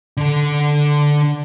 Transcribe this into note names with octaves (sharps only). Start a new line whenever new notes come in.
D3 A4